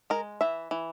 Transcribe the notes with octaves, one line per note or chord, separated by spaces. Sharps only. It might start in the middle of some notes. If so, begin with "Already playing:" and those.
G#3 A#4
E3 E5
E3